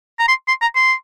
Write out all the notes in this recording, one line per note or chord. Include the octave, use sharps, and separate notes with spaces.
A#5
C6
C6
A#5
C6